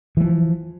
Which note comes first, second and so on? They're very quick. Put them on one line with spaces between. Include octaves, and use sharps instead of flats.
E3 G#3 F3